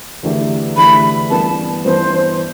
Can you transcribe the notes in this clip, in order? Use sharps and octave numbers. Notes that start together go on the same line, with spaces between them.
E2 D3 A3 E4 G4
E2 D3 A3 E4 G4 B5
G2 E3 B3 A5
G2 E3 B3 C5